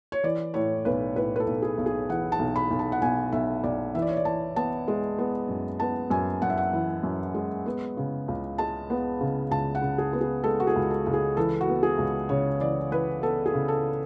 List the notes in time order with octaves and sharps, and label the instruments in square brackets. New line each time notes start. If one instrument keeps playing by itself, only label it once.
[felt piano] C#5
E3 D5
A2 C#5
B1 B4
A2 B4
B4
A4
B1
G#4
B1
G#4
E3 F#5
A5
B1
B5
B1
A5
F#5
B1 G#5
B1 E5
B1 D5
E3 E5
D5
C#5
D5
E3 A5
B3 A5
G#3
B3
F#2
B3 A5
F#2 G#5
F#2 F#5
E5
F#5
E3
F#2
G#3
B3
C#3
C#2
G#3 A5
B3
C#3
C#2 A5
F#5
C#3
G#4
B3
G#4
G#3 A4
F#4
G#4
C#2
A4
C#2
G#4
E3 A4
F#4
B3
G#4
C#2
C#3 C#5
E3 D5
E3 B4
B3 A4
G#4
C#3
A4